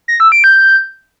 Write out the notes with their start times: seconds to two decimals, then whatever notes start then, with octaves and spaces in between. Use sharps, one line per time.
0.08 A#6
0.20 E6
0.32 D7
0.44 G6